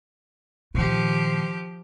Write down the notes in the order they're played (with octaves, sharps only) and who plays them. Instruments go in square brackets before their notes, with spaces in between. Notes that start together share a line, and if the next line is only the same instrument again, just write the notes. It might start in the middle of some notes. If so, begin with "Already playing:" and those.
[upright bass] A#2 D#3 [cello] F3 G4